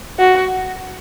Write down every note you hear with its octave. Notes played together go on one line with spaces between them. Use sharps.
F#4